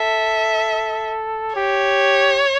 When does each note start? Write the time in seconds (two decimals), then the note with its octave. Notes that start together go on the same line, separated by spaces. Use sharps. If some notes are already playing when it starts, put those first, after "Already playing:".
Already playing: A4 E5
1.56 G4 C#5